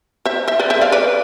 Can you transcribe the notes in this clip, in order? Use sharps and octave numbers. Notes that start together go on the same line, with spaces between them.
C5 E5
C5 E5
B4 D5
C5 E5
D5 F5
B4 D5